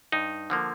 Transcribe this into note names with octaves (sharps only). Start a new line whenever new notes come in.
G2 D#4
D3 F3 A#3